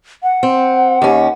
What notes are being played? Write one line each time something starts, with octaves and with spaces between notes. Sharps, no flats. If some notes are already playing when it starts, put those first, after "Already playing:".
F#5
C4
D#2 C#4